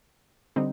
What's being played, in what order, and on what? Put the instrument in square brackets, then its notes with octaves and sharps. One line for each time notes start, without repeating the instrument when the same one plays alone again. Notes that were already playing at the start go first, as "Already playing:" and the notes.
[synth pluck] D3 G3 C4 D#4